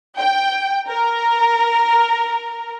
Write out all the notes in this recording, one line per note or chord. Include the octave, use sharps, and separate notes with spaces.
G5
A#4